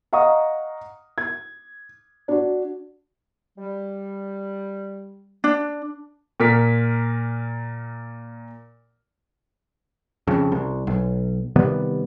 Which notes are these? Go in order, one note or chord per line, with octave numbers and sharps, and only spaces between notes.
D#5 F5 F#5 A#5 C#6 D#6
G#6
D4 F#4
G3
D4
A#2 A#4 B6
F2 C#3
C2
B1
C3 D#3 G3 B3